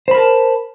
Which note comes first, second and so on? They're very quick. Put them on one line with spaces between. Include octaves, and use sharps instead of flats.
C5 B5 A#4 A5